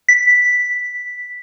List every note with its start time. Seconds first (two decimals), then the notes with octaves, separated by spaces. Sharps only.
0.09 B6